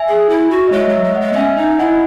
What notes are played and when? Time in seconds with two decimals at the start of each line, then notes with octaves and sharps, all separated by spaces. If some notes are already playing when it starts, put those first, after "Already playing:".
Already playing: E5 G#5
0.08 G#4
0.29 E4
0.51 F#4
0.68 D#5
0.72 G#3 C#5 E5
0.88 F#3
0.94 C#5 E5
1.04 G#3
1.15 D#5 F#5
1.21 G#3
1.33 B3
1.36 C#4 E5 G#5
1.57 D#4 E5 G#5
1.72 E5
1.79 E4 D#5 F#5